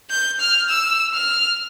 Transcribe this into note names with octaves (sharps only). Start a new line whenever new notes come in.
G6
F6
E6
F6